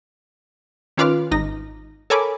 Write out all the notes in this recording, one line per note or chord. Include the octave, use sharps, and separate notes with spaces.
D#3 C#4 F4 B4 D6 F6
G#1 D#4 A#6
A4 A#4 C#5 G#5 B5 D6